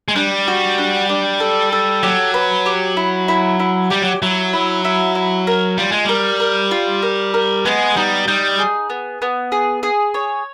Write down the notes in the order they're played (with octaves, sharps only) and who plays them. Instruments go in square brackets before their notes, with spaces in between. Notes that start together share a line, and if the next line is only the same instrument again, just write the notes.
[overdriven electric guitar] G#3
[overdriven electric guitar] G3 [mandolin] D4
[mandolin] F#4
D4
D4
A4
A4
[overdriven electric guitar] F#3 [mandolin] G4
[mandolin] B4
G4
E4
E4
E4
[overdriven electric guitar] G3 [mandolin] G4
[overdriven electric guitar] F#3
[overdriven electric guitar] F#3 [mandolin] E4
[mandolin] E4
E4
E4
A#4
[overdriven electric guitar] G3 [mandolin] F4
[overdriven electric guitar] G#3
[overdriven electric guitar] G3 [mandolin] A#4
[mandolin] A#4
F4
A#4
A#4
[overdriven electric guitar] G#3 [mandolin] B3
[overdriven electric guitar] G3 [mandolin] D#4
[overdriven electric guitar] G3 [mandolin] D#4
[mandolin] G#4
B3
B3
G#4
G#4
C#5